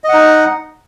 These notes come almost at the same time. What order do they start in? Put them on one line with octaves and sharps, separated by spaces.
D#5 F#5 D#4